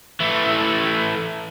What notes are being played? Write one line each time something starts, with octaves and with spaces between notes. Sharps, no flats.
E3 A3